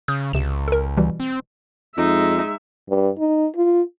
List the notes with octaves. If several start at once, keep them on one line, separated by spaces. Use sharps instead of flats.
C#3 D#6 F6 G6
C#2 C3 E7
A4 A#4
B2 E3 G3
C4
F2 G#3 D#4 E5
G2
D#4
F4